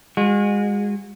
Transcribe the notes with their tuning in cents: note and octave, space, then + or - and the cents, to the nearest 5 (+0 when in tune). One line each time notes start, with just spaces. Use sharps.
G#3 -30 F#4 -40